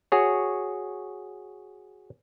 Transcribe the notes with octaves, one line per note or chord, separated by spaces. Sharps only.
F#4 G#4 C#5